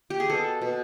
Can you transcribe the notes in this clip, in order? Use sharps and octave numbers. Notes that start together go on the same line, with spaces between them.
G4
G#4
B2 A4
B2